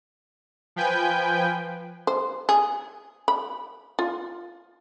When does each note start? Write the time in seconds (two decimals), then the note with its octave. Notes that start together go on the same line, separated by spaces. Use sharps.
0.76 F3 B4 G5 G#5 G6
2.07 C5
2.49 G#4
3.28 B5
3.99 F4